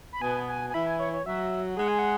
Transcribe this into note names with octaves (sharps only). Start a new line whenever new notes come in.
B5
B2 B3 G#5
G#5
G#5
E3 E4 B5
G#5
C#5
C#5
F#3 F#4 E5
G#3 G#4 F#5
G#5
F#5